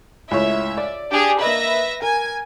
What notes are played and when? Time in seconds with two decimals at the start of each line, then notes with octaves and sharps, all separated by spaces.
0.31 C#2 A2 C#5 E5
0.77 D5
1.10 D4 G4 G#4
1.41 A#3 B4 D#5 E5 A#6
2.02 A#4 G#5